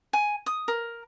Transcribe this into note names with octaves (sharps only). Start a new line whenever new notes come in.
G#5
D#6
A#4